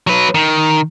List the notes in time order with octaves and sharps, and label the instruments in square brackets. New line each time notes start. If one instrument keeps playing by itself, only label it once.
[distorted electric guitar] F#3 B4
D#3